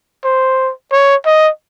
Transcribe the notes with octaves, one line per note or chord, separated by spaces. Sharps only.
C5
C#5
D#5